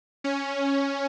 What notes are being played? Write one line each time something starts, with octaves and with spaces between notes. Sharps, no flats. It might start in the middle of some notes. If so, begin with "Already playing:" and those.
C#4